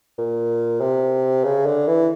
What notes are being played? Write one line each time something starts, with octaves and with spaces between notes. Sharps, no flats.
A#2
C3
C#3
D3
E3